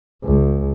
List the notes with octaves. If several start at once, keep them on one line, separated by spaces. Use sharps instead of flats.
C#2